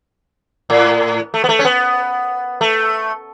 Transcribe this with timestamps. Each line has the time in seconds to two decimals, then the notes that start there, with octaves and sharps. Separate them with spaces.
0.70 A2
1.34 A3
1.44 B3
1.49 A3
1.59 C#4
1.65 B3
2.61 A3